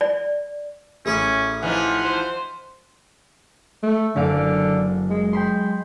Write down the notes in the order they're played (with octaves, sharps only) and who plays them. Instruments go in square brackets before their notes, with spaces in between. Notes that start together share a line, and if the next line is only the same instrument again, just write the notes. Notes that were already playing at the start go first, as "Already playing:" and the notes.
[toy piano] D5
[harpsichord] A1 G#4 B5 [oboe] C#4
[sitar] E3 F3 D#4 [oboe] F#5
[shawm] C5
[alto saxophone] A3
[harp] F#1 F5 D7 [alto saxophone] D3
[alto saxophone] G#3
[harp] G5 B5 C6